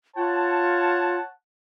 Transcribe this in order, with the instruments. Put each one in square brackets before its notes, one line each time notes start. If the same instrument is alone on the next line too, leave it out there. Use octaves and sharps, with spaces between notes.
[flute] F4 [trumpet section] C#5 F#5 A5